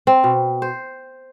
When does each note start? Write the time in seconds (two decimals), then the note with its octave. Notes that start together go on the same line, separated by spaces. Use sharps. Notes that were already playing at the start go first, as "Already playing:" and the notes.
0.07 C4
0.24 B2
0.62 C5